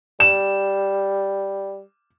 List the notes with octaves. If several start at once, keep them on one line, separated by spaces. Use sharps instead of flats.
G3 E7